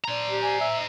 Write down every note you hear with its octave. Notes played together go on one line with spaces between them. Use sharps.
D4 C5 A#5
G4
D5 G#5
E5
D#5